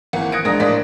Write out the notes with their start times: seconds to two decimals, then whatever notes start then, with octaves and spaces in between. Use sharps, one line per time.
0.13 G#1 E3 A#3 F#5
0.32 D#6 F#6 G#6 A#6 C#7 D7
0.45 A#1 G#3 D4 A#4 D#6 A#6
0.60 A2 A#3 D4 C5 D5 B6